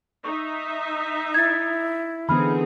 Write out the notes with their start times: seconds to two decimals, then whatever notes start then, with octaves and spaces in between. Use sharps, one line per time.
0.24 D#4 E5 C#6
1.34 E4 G#6 A6
2.29 D3 E3 B3 C4 D#4 G#4 B5 F6